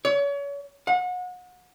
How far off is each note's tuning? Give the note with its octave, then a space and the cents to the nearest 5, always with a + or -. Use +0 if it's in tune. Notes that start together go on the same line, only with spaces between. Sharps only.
C#5 +35
F#5 -35